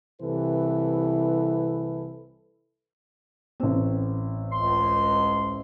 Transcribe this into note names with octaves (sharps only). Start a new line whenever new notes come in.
C2 C3 E3 E4 A4 B4
A1 C4
C#2 C6